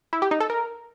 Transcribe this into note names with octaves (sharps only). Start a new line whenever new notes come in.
E4
G4
D#4
A4
A#4